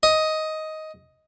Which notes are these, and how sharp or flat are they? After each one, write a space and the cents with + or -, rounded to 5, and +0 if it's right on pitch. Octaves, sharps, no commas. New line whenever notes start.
D#5 +10